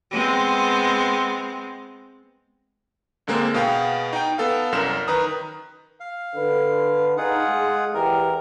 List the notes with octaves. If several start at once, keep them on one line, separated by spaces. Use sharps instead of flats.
G#3 B3 C4
C#2 D3 G#3 A#3 C4
B2 B3 G#4 F5 G5
D#4 G5
B3 A4 F5
C2 F#2 A#4 F6 E7
D#3 B4 A#5 D#6
F5
D3 B4
D#4 F4 G#4 F#5
G#3
E2 G4 A#4